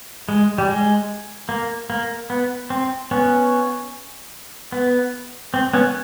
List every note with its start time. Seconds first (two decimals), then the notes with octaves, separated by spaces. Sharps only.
0.29 G#3
0.58 G3
0.68 G#3
1.49 A#3
1.90 A#3
2.30 B3
2.70 C4
3.11 B3 C#4
4.72 B3
5.54 C4
5.74 B3 C#4